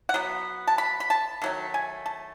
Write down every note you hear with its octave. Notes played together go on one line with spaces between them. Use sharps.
F#5
F#3 B3
A5
B5
B5
A5
D#3 F#3 A3
G#5
A5